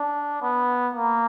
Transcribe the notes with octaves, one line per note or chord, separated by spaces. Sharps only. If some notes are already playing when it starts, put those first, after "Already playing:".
Already playing: D4
B3
A#3